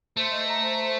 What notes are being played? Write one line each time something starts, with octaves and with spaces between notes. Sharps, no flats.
A3 C5
D#5
A#5
C5
C5